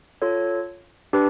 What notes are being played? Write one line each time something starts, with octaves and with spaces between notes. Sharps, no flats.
F4 A4 C#5
D4 G4 B4